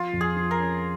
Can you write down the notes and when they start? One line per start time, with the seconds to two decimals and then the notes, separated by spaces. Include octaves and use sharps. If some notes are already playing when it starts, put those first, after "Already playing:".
Already playing: F3 F4
0.13 F2
0.21 G#4
0.36 F3
0.51 A#4
0.59 C#4